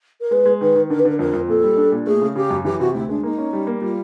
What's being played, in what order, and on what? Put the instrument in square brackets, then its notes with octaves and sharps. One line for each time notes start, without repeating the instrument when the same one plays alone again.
[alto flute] A#4
[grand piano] G#3 [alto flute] B4
[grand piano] G#3
[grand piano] D#3 [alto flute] B4
[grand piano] D#3
[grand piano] D3 [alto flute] A#4
[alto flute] B4
[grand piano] D3 [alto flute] A#4
[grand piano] F2 [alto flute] A#4
[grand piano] F2
[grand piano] A#2 [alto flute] A4
[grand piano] G3
D4
A#2
[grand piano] A3 [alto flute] G#4
[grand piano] C#3
[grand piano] C#3 [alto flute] G4
[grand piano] F#2
[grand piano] E3 [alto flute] G4
[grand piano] C3 [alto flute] F#4
[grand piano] D2 [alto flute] E4
[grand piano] G#3 [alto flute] D4
[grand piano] A#3 [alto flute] D#4
[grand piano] C#4
G3
A#3
[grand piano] G3 [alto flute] F4